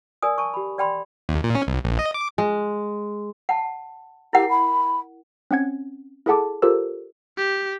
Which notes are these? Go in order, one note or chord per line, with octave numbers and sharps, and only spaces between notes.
A#4 D5 G#5 D#6
G#5 A5 C#6
G4 B5
D5 G5 B5 C6
D#2
A#2
C#4
C2
A#1
D#5
D6
G#3
F#5 A5
E4 G4 A#4 F#5
B5
C4 C#4 F#5 G#6
E4 G#4 A4 F#5 A5 D6
F4 G4 A4 A#4 C5 E6
G4